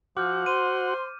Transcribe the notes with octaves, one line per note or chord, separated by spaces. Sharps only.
F3 F#4 F#5 D6 F6 G6
C5 C6 D#7